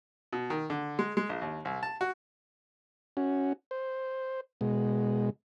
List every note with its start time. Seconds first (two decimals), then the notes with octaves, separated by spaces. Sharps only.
0.33 B2
0.50 D#3
0.70 D3
0.99 G#3
1.17 G#3
1.29 A#1
1.41 D#2
1.65 C2
1.83 A5
2.01 F#4
3.17 C#4 F#4
3.71 C5
4.61 B2 G#3